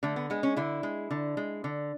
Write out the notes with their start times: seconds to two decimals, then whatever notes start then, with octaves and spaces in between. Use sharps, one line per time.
0.03 D3 A3
0.16 B3
0.30 G#3 B3
0.43 C#4
0.57 D3 E4
0.83 G#3
1.11 D3
1.37 G#3
1.64 D3